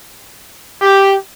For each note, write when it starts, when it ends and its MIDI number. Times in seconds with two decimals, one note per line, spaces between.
0.82 1.13 67